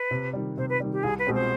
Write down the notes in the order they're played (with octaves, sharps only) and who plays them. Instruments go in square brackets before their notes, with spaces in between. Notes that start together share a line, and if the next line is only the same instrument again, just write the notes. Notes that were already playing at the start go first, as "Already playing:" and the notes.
Already playing: [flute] B4
[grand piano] C3
D#3 G3
[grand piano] C3 [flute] C5
[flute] B4
[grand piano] D#3 G3
[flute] G4
[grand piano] C2 [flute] G#4
[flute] B4
[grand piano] B2 G#3 C4
[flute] C5